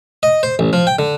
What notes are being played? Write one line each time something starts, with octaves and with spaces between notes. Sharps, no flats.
D#5
C5
A1
F3
G5
D3